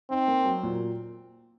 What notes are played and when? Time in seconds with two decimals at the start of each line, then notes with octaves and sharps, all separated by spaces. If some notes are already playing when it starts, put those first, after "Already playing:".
0.10 C4 D#4
0.28 A#3
0.45 F#3
0.63 A#2